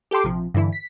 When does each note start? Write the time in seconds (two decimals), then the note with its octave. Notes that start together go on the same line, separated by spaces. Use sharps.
0.11 G4 A4 G5 C6 D6
0.24 A#1 C3 F3
0.54 G2 D3 E3 E4
0.73 B6